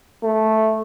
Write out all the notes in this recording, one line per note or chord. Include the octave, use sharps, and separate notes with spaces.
A3